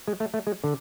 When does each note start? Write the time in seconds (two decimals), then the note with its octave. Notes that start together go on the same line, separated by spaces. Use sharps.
0.08 G#3
0.20 A3
0.34 A3
0.47 G#3
0.64 D3